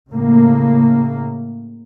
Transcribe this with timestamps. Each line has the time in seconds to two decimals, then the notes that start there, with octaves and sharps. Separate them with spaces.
0.10 A2 C#3 A#3